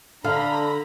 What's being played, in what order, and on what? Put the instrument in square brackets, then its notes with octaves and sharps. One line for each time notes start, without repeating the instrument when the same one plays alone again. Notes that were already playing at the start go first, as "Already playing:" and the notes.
[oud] D3 [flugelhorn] D4 [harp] F5 [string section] A#5 B5